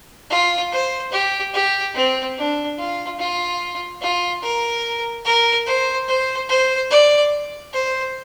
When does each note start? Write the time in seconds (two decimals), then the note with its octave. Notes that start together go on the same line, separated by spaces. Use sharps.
0.30 F4
0.72 C5
1.12 G4
1.54 G4
1.94 C4
2.36 D4
2.78 F4
3.19 F4
4.02 F4
4.43 A#4
5.25 A#4
5.67 C5
6.08 C5
6.49 C5
6.91 D5
7.73 C5